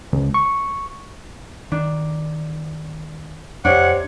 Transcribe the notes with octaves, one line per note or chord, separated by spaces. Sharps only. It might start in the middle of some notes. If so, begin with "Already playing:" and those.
C#2
C#6
D#3 D4
F2 C3 D4 C#5 F#5